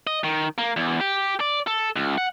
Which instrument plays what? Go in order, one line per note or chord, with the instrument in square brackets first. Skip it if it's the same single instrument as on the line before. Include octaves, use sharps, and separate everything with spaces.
[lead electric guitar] D#5
D#3
A#3
E2
G4
D5
A4
C#2
F#5